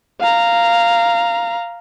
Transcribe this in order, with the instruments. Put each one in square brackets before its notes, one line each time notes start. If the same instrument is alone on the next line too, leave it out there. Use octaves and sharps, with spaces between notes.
[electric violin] F5 A#5